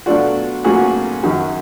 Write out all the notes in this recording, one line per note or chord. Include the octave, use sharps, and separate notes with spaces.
B2 F#3 A3 D4 F4 F#4
B1 A2 F#3 A#3 C#4 F#4 G#4
F#2 D#3 F#3